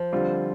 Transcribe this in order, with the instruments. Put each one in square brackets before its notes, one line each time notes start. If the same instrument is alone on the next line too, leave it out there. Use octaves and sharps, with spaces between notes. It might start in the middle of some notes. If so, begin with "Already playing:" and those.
Already playing: [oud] F3
[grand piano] D3 G3 C4 F4